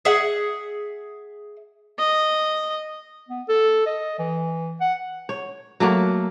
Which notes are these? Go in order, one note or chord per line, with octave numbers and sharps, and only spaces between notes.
G#4 E5 F#5
D#5
B3
A4
D#5
E3
F#5
C#5
F#3 A3 A#3